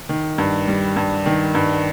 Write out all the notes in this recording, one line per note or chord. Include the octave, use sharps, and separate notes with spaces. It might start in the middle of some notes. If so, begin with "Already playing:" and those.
D#3
G2
G3
G2
D#3
G2